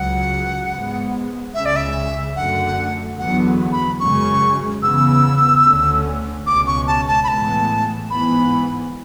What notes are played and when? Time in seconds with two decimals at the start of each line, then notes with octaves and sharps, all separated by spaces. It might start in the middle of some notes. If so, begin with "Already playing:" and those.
Already playing: C#2 C#3 F#3 F#5
0.71 G#2 G#3 B3
1.54 C#2 C#3 G#3 C#4 E5
1.66 D5
1.76 E5
2.36 F#2 D3 A3 F#5
3.18 E2 D3 F#3 B3 F#5
3.72 B5
4.00 F#2 C#3 G#3 C#4 C#6
4.82 E2 C#3 E3 B3 E6
5.64 D2 D3 A3 C#4
6.46 C#2 B2 G#3 C#4 D6
6.67 C#6
6.87 A5
7.08 A5
7.24 B5
7.28 A2 E3 G#3 B3 A5
8.10 G#2 E3 B3 B5